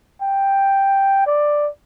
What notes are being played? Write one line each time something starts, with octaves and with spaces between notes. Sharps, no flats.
G5
D5